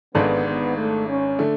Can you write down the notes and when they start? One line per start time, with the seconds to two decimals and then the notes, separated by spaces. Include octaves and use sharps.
0.14 G#1 G#2 G#3 B3 D4 A4
0.46 B3
0.77 A3
1.07 C#4
1.39 D3 A3